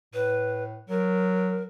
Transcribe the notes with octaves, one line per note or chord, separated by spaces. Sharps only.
A2 B4
F#3 A#4